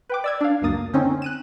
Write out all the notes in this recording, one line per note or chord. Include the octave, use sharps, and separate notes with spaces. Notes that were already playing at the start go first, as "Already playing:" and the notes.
B4 G5 D6
D5 E6 G#6
D4 F5
C#2 F#2 A#3 D#6 A6
D3 C4 C#4 D#4
F#6 D#7 E7